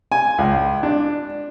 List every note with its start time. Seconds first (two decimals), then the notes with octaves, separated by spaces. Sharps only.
0.12 G#5
0.39 C#2
0.83 D4